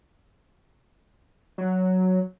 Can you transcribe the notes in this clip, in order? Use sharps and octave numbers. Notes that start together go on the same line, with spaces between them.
F#3